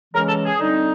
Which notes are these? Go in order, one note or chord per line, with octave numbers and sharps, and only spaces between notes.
C#3 E3 G#3 C#4 A#4
A4
G#4
D3 G3 C4 D#4